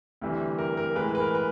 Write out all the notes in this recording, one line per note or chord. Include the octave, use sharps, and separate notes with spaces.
D2 C3 E3 G3
A#4
A#4
A2 E3 G#3 B4
B4
A#4
B4